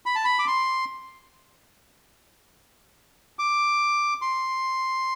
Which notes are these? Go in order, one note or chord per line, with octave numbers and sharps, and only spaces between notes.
B5
A5
B5
D6
C6
D6
C6